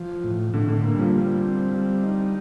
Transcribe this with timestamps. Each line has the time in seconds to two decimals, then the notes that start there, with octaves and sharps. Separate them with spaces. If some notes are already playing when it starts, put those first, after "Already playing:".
Already playing: F3
0.24 A2
0.54 A2 D3
0.68 D3
0.84 A#3
0.94 G3
0.99 F3
1.14 G3
1.43 C4
1.73 G3
2.03 D#4